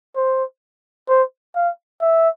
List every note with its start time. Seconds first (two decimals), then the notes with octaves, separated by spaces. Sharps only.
0.16 C5
1.09 C5
1.55 F5
2.01 E5